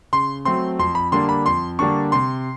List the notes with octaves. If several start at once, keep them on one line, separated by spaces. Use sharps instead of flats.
C#3 C6
F#3 A3 C4 C6
F2 C6
B5
D3 G3 A#3 D4 C6
B5
F2 C6
D3 G3 A#3 D4 C#6
C3 C6